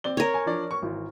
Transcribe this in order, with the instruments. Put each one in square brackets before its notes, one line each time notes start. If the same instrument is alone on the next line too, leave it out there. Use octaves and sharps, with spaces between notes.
[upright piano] C4 D5 G7
[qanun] A#4 C#5
[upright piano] G#5
F3 D4 D5
C#6
G#1 E3